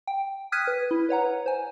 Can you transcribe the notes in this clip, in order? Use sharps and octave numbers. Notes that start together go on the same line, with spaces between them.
G5
D#6 F6 F#6 G#6 B6 D#7
B4
E4
B4 C#5 F#5 A#5
C5 G#5